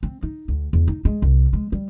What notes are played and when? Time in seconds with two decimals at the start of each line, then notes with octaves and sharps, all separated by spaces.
0.03 C4
0.22 D#4
0.48 D2
0.73 E2
0.88 D#4
1.05 G#3
1.22 C2
1.53 G#3
1.72 G3